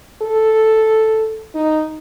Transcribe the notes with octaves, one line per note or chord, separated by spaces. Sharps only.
A4
D#4